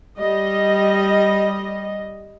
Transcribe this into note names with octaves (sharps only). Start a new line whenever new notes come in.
G3 D#5